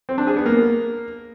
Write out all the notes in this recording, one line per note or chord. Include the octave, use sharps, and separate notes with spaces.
C4
D4
G#4
B3
A#3